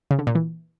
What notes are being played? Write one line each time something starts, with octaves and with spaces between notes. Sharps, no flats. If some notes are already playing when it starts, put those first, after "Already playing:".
C#3
D3
A#2
E3